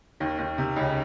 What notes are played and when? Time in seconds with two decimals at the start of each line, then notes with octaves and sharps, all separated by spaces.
0.20 D#2 D#3
0.39 D#2 D#3
0.58 C3
0.76 C#2 C#3